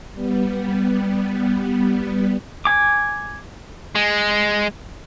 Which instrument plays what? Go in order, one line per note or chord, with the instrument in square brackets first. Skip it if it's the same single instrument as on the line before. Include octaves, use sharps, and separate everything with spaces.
[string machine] G3 B3
[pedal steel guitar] G#5 D6
[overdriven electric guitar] G#3